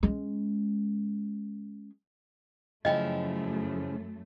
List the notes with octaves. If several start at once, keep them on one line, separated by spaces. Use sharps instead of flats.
G#3 C#4
F#2 C#3 F3 A3 E4 D#5 G5